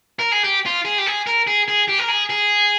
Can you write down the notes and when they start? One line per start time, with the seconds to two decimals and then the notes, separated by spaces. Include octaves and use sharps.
0.19 A#4
0.32 G#4
0.44 G4
0.66 F4
0.85 G#4
0.98 G4
1.07 G#4
1.26 A#4
1.47 G#4
1.68 G#4
1.88 G4
1.98 A#4
2.08 G#4
2.29 G#4